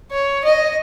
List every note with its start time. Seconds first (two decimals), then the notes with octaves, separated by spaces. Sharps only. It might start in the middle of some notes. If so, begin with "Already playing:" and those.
0.12 C#5
0.44 D#5